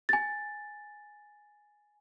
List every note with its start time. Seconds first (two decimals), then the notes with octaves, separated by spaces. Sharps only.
0.09 G#5 A6